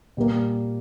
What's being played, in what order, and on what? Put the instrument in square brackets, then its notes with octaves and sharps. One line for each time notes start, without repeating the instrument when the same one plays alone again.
[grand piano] A#2 G3 A#3